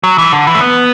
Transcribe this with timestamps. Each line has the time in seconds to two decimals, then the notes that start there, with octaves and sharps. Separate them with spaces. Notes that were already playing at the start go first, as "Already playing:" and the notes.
0.04 F#3
0.18 E3
0.32 D3
0.47 E3
0.55 A3
0.61 B3